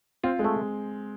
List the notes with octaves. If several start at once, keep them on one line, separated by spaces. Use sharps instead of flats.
C4 F4
G#3
A3